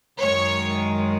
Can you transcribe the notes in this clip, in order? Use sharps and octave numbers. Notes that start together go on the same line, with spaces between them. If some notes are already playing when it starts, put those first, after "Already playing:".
F#2 D#3 G#3 C#5